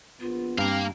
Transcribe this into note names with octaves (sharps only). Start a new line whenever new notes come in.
A#1 B3 F4
G2 A#3 C4 F5